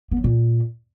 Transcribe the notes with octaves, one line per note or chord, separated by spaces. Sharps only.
B3
F#3
A#2